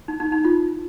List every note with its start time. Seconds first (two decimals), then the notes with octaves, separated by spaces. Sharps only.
0.08 D#4
0.20 D#4
0.32 D#4
0.45 F4